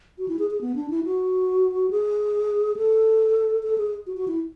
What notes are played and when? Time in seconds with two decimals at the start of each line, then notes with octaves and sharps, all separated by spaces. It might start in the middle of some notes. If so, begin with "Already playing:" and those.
0.18 F#4
0.28 E4
0.39 G#4
0.51 G#4
0.61 B3
0.76 D4
0.90 E4
1.04 F#4
1.91 G#4
2.77 A4
3.63 A4
3.78 G#4
4.07 F#4
4.17 F#4
4.28 E4